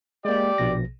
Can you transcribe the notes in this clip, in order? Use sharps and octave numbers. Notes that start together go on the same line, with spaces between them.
G#3 A#3 G4 D5
A#1 B2 A#6